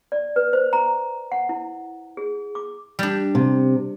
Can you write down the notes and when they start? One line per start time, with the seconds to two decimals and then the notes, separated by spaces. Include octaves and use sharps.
0.12 D5
0.36 B4
0.53 C5
0.73 A#5
1.32 F#5
1.49 E4
2.17 G#4
2.55 D6
2.99 G3 D4
3.35 C3